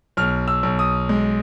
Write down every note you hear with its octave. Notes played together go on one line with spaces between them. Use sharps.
B1 F6
E6
B1
D#6
G#3